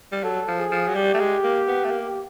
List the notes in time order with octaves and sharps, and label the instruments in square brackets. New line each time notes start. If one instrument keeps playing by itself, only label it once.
[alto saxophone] G3
[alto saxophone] F#3 [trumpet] A4
[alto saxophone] F3
[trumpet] G#4
[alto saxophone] F3
F#3
[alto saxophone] G3 [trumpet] G4
[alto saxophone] A3
G#3
A#3
B3
A3
A#3